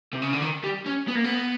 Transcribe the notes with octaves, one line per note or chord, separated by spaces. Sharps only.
C3
C#3
D3
D#3
G3
C#4
B3
A#3
B3